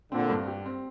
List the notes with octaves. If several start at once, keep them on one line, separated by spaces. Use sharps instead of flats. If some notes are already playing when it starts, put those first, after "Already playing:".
A#2 D3 C4
G2
G4
C4